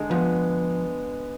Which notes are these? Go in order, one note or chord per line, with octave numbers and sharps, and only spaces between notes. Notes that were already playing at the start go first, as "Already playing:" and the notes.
Already playing: D3 G#3
F3 B3